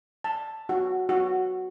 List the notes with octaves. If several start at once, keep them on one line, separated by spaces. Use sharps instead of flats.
A5
F#4
F#4